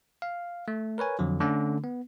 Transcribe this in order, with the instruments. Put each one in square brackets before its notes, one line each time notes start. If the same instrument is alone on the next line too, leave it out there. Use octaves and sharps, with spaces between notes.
[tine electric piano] F5
A3
A#4 B4 C#5 G#5
F2 D3 F3 F#3
D3 A3 C#4
B3